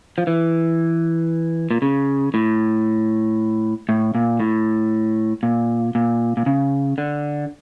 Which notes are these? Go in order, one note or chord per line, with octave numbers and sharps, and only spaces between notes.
F3
E3
A#2
C#3
A2
A2
A#2
A2
A#2
A#2
A#2
C#3
D3